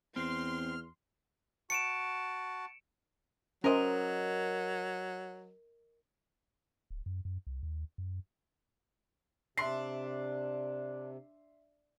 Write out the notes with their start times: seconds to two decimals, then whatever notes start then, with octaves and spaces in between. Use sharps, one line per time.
0.16 E2 C4 C6 F6
1.70 F#4 A5 C#7 D7 E7
3.64 F#3 C#4 A#4 C5 D#5
6.90 D1
7.06 F#2
7.25 F#2
7.47 C2
7.63 D#2
7.98 F#2
9.58 C3 D4 E5 C6 C7